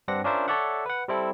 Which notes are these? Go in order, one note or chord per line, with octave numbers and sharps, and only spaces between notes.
G2 C4 D4 F#5 A#6
C#4 D4 F4 A#4 C5 E5
A4 C#5 D5 E5 F#5
B4 F#5
G3 C4 E4 A4